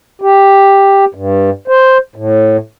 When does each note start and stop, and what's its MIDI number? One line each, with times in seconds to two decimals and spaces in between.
0.22 1.05 67
1.15 1.50 43
1.68 1.98 72
2.16 2.57 45